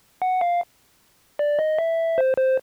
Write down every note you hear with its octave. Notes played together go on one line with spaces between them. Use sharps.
F#5
F5
D5
D#5
E5
C5
C5